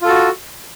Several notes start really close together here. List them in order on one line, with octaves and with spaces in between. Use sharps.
F4 A4 F#4